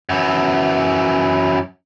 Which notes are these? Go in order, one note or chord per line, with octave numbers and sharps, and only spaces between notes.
F#2 E3